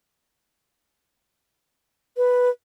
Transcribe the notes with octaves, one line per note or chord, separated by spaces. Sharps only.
B4